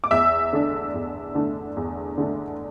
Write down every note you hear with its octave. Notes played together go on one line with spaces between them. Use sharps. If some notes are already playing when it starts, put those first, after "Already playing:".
D6
E2 E5 E6
D3 A3 D4
E2
D3 A3 D4
E2
D3 A3 D4